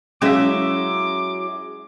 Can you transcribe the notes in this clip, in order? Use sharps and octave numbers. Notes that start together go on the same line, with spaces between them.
F#3 G#3 C#4 E4 E5 F5 D6